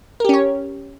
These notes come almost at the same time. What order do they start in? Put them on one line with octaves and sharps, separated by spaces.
A#4 G4 C#4 C#5